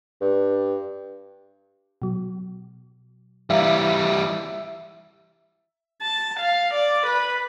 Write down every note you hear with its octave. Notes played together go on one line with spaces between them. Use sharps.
G2
B2 F#3
E3 G3 E5 F5 A#5
A5
F5
D5
B4